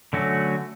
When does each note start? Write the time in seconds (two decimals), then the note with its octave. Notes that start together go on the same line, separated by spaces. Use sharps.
0.13 D3 F#3 A3 C#4 F#4